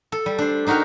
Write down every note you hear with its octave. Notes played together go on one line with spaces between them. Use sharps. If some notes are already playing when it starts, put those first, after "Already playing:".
A4
G3
D4 C5
D4 D#4 F#4 G4 A#4